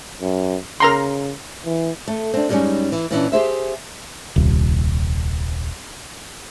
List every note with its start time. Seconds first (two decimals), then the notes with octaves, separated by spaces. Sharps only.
0.21 F#2
0.80 C#3 A#4 A#5 C6
1.65 E3
2.08 A3
2.34 C4 D4
2.49 F#2 G3 G#3 A#3 C#4 D#4
2.92 E3
3.11 A#2 E3 C#4 D4
3.32 G4 G#4 C5 E5
4.36 D#1 C2